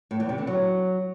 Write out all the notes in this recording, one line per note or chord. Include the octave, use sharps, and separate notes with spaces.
A2
E2
C3
D3
F#3